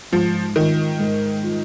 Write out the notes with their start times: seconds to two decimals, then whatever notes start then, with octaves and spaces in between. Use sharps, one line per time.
0.12 G#2 F3
0.56 D#3 F4
0.99 G#2
1.43 F4